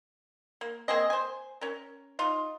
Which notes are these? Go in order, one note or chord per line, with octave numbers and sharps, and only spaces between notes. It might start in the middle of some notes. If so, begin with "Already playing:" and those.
A#3
A#3 C4 G#4 D#5
C5 G#5
C#4 A#4
D#4 F4